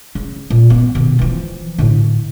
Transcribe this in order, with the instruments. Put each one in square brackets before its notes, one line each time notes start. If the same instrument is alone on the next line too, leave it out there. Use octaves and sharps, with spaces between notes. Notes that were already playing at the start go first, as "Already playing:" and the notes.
[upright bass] C#3
A#2
B3
B2 D#3
E3 F3
A2 D3